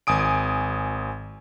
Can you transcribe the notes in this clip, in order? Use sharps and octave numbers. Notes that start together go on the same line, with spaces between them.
G#1 G#5 D#6 D7